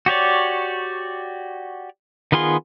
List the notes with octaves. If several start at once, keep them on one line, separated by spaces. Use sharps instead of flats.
F#4 G4 C#5 D5
D#3 B3 F4 G#4 C6